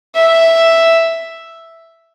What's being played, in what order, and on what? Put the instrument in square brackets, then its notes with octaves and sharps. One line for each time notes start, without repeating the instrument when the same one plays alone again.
[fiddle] E5